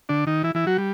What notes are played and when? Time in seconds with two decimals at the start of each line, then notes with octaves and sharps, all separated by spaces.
0.09 D3 D4
0.27 D#3 D#4
0.43 E3 E4
0.55 E3 E4
0.67 F#3 F#4
0.78 G3